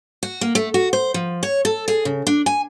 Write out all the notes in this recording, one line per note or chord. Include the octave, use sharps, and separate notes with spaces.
F#4
A#3
A3
F#4
C5
F3
C#5
A4
G#4
C#3
D4
G#5